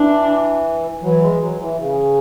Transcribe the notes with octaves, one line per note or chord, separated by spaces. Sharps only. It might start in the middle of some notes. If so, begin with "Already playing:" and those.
Already playing: E3 D4
E3 F#3
G#3
F#3
E3
C#3